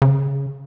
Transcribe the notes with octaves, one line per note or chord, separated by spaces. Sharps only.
C#3